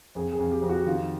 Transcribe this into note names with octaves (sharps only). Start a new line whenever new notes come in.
F2 G#4
G#4
F2
G4
F2
F#4
D#3 F4